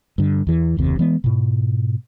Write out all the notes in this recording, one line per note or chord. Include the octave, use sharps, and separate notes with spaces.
G2 D3
E2 E3
F#1 D#2 C3
E3 G#3 B3
G#2 B2